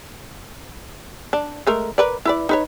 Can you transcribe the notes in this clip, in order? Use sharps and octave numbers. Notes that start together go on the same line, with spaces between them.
D4
G#3 A3 A#4
A#4 B4 D5
E4 B4 D5
D#4 B4 C#5